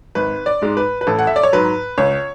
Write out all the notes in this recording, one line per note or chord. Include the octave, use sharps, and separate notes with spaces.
G#1 B4
D5
G#2 G#3
B4
B4
A1 A4
F#5
E5
D5
C#5
G#2 F#3 B4
C#2 C#5